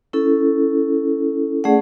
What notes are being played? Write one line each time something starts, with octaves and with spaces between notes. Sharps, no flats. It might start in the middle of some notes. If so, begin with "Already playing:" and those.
C#4 E4 A4
A3 C#4 G#4 D5 F#5